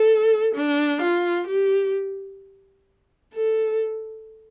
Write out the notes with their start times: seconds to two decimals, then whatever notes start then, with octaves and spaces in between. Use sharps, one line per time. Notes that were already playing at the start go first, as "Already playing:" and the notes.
Already playing: A4
0.55 D4
1.02 F4
1.48 G4
3.34 A4